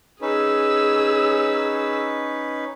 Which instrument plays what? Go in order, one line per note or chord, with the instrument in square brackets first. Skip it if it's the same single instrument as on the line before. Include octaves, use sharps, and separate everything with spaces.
[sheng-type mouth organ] C#4 D#4 B4 [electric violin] G#4 E6